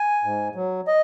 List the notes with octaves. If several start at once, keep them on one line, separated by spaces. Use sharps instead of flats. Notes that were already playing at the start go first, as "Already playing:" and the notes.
Already playing: G#5
G#2
F#3
D#5